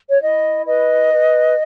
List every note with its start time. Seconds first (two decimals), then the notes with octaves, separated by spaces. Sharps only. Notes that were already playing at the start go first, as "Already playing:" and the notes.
0.10 C#5
0.20 E4 D#5
0.66 B4 D#5
1.12 B4